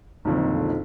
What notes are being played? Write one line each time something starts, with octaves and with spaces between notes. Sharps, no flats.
B1 F2 A#2 D3 D#3